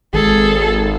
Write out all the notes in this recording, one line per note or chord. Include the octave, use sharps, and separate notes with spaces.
G#1 G#4 A4